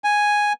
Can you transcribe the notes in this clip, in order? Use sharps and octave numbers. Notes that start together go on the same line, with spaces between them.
G#5